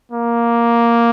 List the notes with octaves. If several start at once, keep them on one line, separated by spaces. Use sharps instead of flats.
A#3